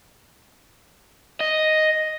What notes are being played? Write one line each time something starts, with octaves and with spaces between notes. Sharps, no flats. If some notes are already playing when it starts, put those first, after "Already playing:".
D#5